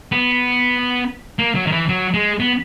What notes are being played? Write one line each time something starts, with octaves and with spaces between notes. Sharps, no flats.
B3
A#3
F#3
D#3
E3
F#3
G#3
B3